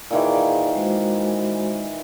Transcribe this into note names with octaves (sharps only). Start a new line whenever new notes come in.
A#2 D#3 E3 G#4 D5
G#3 F#4 C5